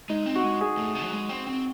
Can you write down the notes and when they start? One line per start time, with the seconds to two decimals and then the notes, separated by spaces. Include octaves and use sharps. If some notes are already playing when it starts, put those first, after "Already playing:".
0.09 G#3 D#4
0.26 C4
0.35 F#4
0.43 G#3
0.61 G#4
0.78 A2
0.95 C3
1.04 F#3
1.11 G#3
1.29 C4
1.47 C4